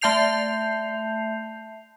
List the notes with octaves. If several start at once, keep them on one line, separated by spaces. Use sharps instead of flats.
A3 E5 A5 G6 C7 F7